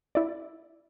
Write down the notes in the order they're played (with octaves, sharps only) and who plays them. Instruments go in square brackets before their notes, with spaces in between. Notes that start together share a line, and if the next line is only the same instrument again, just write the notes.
[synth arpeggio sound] E4 D5